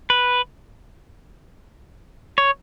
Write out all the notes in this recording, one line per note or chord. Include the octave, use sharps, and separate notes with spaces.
B4
C#5